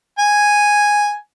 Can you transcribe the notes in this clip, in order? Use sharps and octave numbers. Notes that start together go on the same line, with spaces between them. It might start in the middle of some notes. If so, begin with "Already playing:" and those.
G#5